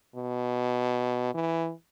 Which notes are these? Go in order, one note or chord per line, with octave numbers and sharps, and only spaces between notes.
B2
E3